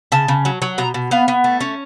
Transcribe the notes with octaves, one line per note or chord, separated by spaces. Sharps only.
C#3 A5
C#3
F#3
F#3
B2 A#5
B2
B3 F5
B3
A3
C#4